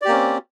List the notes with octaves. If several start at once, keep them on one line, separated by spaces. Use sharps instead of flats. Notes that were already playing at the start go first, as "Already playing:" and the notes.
A#3 C4 C#4 G4 D5